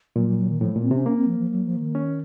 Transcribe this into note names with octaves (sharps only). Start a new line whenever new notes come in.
A#2 F#3
F#3
F#3
D#3
A2 F3
A#2 A3
C4
C3 C#4
A#3 C#4
C4
F3
F3
F#3
F3
D#3
C#4